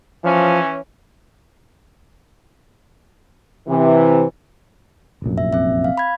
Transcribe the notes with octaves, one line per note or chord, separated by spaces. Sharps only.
E3 F3 C#4
C3 E3
F1 A#1 F#2
E5
C4 E5
F5
B5 G#6